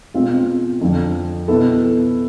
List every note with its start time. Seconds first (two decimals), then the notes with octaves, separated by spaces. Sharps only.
0.14 B2 G#3 C4 F4
0.81 F2 D3 F3
1.48 B2 B3 E4 A4